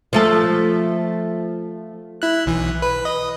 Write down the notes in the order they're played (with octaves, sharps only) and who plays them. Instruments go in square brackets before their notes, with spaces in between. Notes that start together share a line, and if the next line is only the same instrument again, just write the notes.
[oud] F3 A3 A4
[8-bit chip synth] E4 F#6
B1 E3
B4
D#5